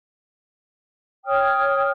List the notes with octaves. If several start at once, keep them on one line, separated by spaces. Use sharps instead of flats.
C#5 G5 D#6 F6